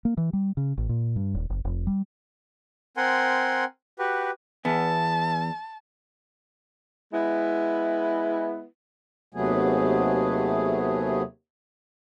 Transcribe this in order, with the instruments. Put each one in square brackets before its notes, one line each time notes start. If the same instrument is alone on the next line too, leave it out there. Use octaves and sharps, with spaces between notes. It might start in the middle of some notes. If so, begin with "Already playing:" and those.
[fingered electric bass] A#3
E3
G3
C#3
A1
A#2
G2
D#1
F#1
F1
G3
[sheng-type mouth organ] C4 A#4 F#5 G#5 C6
F#4 G4 B4
[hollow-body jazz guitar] E2 B3 [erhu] A5
[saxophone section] G#3 B3 E4
[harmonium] D#2 C3 F#3 A3 B3 G#4